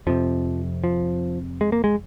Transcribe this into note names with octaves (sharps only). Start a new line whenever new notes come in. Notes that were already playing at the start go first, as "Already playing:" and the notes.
F2 C3 F3
F3
G#3
A#3
G#3